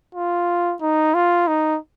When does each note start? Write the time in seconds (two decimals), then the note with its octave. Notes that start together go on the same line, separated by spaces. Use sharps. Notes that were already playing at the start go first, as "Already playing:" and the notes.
0.15 F4
0.81 D#4
1.14 F4
1.48 D#4